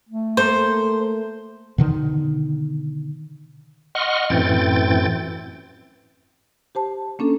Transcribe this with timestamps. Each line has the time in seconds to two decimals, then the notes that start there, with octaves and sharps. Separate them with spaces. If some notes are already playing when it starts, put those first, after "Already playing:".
0.09 A3
0.37 A#3 A4 C5
1.78 B2 D3 D#3
3.95 D#5 F#5 C6 C#6 F6
4.30 F#2 A2 E3 C4 G5 A6
6.75 G4 C5 A5
7.19 A#3 C#4 D4 A4